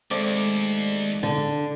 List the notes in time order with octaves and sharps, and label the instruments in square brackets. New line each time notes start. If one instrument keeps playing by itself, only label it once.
[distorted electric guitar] D#2 [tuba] G#3 [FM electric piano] A3 C4 D5
[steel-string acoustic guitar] D3